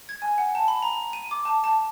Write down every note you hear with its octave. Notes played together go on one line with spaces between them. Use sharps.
G#6
G#5
F#5
A5
B5
A#5
D#7
D6
A5
A5